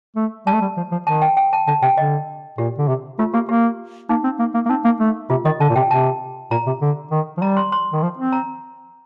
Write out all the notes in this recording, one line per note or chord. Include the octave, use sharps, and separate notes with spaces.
A3
G3 A5
A3
G3
F3
F3
D#3 A5
G5
G5
A5
D3 A5
C3 G5
D3 D#5
A#2 G4
D3
C3
A3 F4
A#3 G4
A#3 G4
A#3 D#4
C4
A#3
A#3
A#3
C4 D#4
A#3
A3
C3 F4
D#3 D#5
D3 A5
A#2
C3 G5
C3 A5
A#2 A#5
C3
D3
D#3
F3
G3 A#5
C6
C6
D#3
F3
C4
A#5